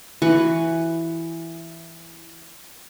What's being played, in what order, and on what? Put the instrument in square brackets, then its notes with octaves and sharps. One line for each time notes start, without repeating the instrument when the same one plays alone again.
[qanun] E3 F#4 B4 C#6